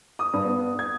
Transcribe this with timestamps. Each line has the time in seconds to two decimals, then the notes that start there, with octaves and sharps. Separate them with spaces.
0.19 D#6
0.33 G2
0.45 B3
0.79 G#6